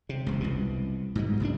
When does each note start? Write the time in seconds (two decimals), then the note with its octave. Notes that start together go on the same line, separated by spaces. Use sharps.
0.09 C3
0.27 E1 C#2
0.40 C2 B2
1.15 G#2 B2 G#3
1.40 F#1 B1 A#2 D4